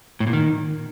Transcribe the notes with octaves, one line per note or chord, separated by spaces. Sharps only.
A2
A#2
D#3